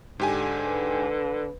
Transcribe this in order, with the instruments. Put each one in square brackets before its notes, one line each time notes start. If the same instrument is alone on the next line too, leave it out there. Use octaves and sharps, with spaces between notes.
[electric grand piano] G#2 G4 G#5 [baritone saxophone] D3
[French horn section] B4